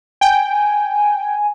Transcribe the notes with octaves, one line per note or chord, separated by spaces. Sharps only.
G5 G#5